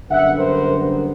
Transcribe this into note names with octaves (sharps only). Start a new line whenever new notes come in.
F#2 D3 G3 B3 E5 F#5
A#4 C5